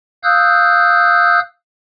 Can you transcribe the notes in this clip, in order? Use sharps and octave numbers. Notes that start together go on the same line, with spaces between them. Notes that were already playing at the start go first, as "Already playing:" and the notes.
F5 D#6 E6 F#6 G6